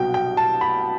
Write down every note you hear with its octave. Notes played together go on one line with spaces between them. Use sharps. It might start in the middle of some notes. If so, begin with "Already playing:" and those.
Already playing: C2 B2 F#3 G5
G5
A5
B5